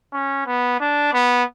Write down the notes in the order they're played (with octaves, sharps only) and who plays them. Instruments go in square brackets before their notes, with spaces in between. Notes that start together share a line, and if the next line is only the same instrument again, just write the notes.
[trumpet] C#4
B3
D4
B3